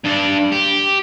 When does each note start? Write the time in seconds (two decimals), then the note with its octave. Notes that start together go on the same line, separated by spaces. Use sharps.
0.05 G2 D4
0.52 G4